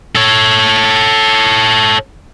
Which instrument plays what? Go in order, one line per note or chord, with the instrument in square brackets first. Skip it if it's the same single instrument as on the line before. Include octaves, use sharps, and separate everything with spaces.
[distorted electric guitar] A4 C#5